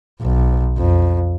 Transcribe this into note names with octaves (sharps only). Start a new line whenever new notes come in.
B1
F2